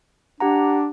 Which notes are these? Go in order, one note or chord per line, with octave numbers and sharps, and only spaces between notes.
D4 G4 F#5 A#5